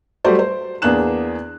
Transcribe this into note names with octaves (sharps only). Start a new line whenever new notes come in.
F#3 G3 A3 F#4 C5 D5
C5
E2 A#3 D4 G#4 F#6 E7